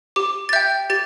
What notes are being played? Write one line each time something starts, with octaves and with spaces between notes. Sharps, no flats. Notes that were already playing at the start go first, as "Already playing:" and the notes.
G4 D6
A6
E5 G5 G6
G4 A6